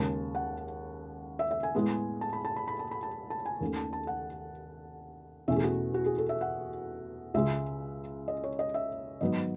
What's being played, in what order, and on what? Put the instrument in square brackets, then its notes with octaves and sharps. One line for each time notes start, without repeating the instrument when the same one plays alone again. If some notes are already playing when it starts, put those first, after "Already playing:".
Already playing: [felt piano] D#2 C#3 G#3 A5
F#5
E5
E5
G#5
A2 G#3 B3
A5
B5
A5
B5
B5
A5
B5
A5
A5
G#5
D#2 D#3 A3 C#4
A5
A5
F#5
E2 B2 A3 C#4 E5
G#4
F#4
F#4
G#4
A4
E5
F#5
C#2 C#3 G#3 E5
D#5
C#5
D#5
E5
G#2 D#3 F#3 B3 D#5